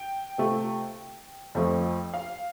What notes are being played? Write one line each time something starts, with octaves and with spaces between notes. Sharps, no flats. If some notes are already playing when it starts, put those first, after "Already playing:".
Already playing: G5
C3 A3 F4
F2 F3 A3 C4
F5